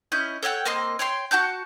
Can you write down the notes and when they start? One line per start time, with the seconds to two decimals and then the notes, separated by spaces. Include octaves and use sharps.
0.12 C#4 E4 D#5 G6
0.43 A4 C#5 F#5 G5
0.65 A#3 C4 D#5 C6
0.99 C#5 G5 C6
1.31 F#4 F#5 A5 G6